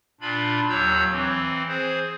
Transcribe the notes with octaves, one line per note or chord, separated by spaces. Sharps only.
A#2 D4 F4 B5
D#2 F#3 C#5 E6 G6
E3 C4
G#4 C5